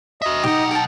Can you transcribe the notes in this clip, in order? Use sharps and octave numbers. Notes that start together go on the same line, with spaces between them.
F#4 D#5 E5
B1 D#4 G4 F#5
A#4 G5 A5